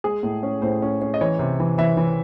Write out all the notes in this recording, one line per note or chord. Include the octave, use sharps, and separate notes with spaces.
G#3 G#4
A2
C#4
A2 C5
C#4
C#4
D#5
E3 C#5
C3
E3
E3 E5
E3